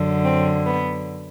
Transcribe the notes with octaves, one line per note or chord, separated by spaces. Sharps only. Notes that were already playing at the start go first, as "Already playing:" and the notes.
Already playing: F#2 D3
C4
B3